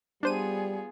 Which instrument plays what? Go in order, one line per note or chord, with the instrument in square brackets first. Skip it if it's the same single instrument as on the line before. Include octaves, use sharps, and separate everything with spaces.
[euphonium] G3 [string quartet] B3 F4 G#4 [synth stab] D4 C5 D#7